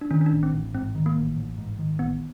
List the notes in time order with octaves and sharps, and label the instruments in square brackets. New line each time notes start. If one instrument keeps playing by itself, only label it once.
[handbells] D4
[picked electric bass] D#3 [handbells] C#4
[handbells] C#4
D4
[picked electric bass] A1
[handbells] C4
[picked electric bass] A1
[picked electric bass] G#2 [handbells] C4
[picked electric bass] D#3
[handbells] A#3
[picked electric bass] A1
A1
G#2
D#3
[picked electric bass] A1 [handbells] B3